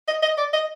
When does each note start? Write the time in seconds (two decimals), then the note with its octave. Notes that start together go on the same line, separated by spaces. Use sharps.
0.08 D#5
0.23 D#5
0.38 D5
0.53 D#5